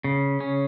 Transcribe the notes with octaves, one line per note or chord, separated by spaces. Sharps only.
C#3
C#4